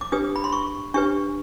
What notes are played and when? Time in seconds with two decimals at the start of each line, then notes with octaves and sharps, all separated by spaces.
0.01 D6
0.12 D4 G4 B4 D#6
0.36 B5
0.44 C6
0.52 C#6
0.94 D4 G4 B4 C#6